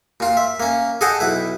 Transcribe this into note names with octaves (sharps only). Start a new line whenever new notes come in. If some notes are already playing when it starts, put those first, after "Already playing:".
A#2 F4
E5
A#3 C#4
G#4 A4 D#5 F#5 G5 A5
B1 E4 B4